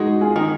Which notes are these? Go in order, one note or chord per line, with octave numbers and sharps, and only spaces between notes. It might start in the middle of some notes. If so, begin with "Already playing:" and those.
Already playing: G#3 D#4 F#4
F4 G#4
D#3